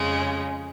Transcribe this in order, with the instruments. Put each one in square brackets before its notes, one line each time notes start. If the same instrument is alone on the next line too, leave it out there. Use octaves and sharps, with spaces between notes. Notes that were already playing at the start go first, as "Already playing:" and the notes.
Already playing: [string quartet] F2 C#3 G#3 C#4